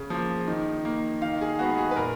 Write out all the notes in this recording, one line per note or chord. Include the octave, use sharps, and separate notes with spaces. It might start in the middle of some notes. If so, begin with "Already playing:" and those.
Already playing: C#3
F3 A#3
D#3
A#3
D#3 F5
G#4
G#3 B3 F#4
G#4
B4
A#2 A#4